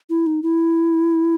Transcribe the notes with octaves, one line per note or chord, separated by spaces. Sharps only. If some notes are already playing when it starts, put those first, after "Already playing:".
E4
D#4
E4